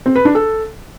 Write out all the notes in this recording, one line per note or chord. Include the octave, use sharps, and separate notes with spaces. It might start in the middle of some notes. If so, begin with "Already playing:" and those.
C4
B4
D4
A4